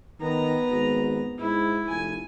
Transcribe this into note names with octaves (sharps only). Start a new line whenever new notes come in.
D#3 B3 A#5
G#1
G#2 E4
F1 G#5